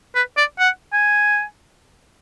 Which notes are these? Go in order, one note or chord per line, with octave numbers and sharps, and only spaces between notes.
B4
D5
F#5
G#5